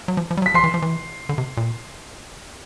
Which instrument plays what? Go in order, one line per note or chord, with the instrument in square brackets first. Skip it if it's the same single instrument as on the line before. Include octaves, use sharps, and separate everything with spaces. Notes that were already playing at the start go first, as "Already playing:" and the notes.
[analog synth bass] F#3
F3
F3
G3
F#3
[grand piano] B6
[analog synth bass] F3 [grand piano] C6 C7
[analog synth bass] E3
F3
E3
D3
C3
A#2